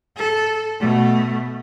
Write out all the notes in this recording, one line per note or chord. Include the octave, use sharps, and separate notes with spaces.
A4
B2 A3